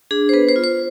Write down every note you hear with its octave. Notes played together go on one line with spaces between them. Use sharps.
D4 G#4
C5
B3 B4
C5
F4
C5